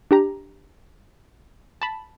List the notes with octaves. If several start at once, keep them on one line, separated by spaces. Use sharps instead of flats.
D4 G4 A#5
A5 B5